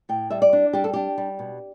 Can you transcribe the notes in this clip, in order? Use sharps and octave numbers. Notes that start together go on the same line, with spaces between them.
A2 G5
G3 E5
D5
D4
G3 G4
A4
D4 G4
G3
B2